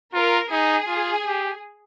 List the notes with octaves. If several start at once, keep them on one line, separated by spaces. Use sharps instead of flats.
F4 A#4
D#4 G#4
F4
G4